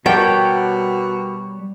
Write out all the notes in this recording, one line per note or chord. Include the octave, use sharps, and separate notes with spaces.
B2 G3 G4 A#4 C#5 F#5 G5 A5